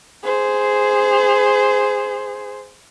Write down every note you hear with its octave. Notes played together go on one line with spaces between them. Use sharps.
G#4 C5